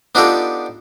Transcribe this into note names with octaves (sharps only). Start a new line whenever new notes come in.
B3 D4 D#4 F4 G4 A4